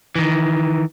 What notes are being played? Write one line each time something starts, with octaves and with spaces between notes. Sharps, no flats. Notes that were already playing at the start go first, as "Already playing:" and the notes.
D#3 E3